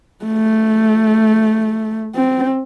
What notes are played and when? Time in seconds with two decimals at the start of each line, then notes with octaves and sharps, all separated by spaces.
0.25 A3
2.16 C4